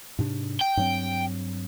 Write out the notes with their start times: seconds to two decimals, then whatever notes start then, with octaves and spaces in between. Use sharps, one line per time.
0.19 G#2 C3 D4
0.61 G5
0.77 G2 F#3 C4